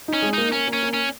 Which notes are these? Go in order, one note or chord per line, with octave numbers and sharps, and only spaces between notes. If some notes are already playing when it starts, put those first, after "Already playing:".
D#4
C#4
G#3
A#3 D#4
A#3 C#4
A#3
C#4
A#3
C#4